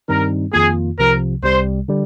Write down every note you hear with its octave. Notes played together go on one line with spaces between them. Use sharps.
G2 D#3 G3 C4 D#4 A#4
F2 D#3 A#3 F4 G#4
C2 C3 F3 A#4
C2 C3 G3 C5
D3 G3